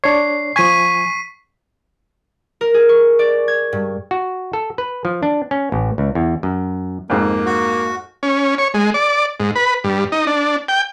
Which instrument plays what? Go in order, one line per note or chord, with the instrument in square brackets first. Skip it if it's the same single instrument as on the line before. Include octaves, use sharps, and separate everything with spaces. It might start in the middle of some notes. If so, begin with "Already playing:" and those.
[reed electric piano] D4 C#5 [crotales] C7
[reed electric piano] F3 G#5 [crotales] C#6 B6 D#7
[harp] A#4
G#4
C#6
D5
G#6
G2
[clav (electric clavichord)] F#4
A4
B4
F3
D4
C#4
A1
C#2
E2
F#2
[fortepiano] F2 G#2 [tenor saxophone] A#3
[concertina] F#4
[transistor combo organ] C#4
C#5
G#3
D5
G#2
B4
G2
D#4
D4
G5